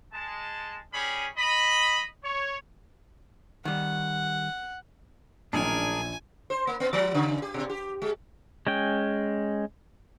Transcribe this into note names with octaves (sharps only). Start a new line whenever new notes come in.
G#3 A5
G3 C#4 G#4 B5
D#5 B5
C#5
D#3 G3 F#5
A#1 F#2 A2 D#3 D4 G#4 A#4 G#5
C5
A#3
B3
F3
C#3
G4
B2
G4
G#3
G#3 C#4 G5